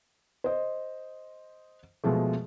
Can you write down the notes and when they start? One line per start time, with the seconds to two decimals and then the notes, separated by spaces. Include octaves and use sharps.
0.44 C5 D#5
2.04 B2 F3 G#3 A3